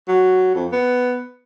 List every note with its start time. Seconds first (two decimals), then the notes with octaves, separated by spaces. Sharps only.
0.08 F#3
0.55 F2
0.72 B3